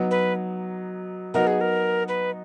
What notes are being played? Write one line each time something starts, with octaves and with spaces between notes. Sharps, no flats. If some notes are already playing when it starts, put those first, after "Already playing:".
Already playing: F#3 B3 D#4
B4
F#3 B3 D#4 F#4 A#4
G#4
A#4
B4